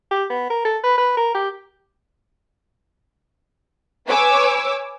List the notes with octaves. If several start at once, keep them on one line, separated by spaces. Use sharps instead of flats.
G4
B3
A#4
A4
B4
B4
A#4
G4
B4 C#5 G#5 D6 E6